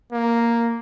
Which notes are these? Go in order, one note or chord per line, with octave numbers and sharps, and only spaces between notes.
A#3